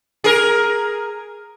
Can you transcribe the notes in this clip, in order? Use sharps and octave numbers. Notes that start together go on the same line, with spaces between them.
G#4 A#4